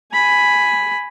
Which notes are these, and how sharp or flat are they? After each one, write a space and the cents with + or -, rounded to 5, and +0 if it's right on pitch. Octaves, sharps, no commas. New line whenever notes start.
G#5 +0 B5 +0